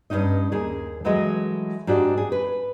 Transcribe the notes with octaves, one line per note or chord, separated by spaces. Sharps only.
G2 A#2 C#4 D#4 D#5
D#2 G#4
E3 F#3 G#3 A3 D#5
G#2 D4 F#4 G4 D5
G#4
B4